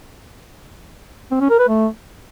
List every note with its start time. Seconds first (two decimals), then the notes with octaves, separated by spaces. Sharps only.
1.31 C4
1.40 C#4
1.50 A#4
1.59 B4
1.68 A3